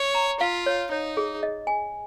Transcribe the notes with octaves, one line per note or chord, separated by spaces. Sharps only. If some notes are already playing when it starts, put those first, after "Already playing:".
Already playing: C#5
A#5
F4 F5
C#5
D#4 C#5
G#4
D#5
G#5